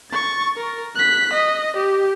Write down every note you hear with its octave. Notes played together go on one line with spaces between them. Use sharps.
C#6 A6
A#4
F#6 B6
D#5
G4